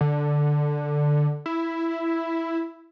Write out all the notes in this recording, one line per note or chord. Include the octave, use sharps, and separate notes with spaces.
D3
E4